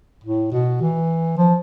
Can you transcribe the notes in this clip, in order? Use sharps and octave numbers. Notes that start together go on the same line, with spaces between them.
A2
B2
E3
F3